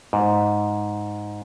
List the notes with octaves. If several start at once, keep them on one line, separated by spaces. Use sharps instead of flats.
G#2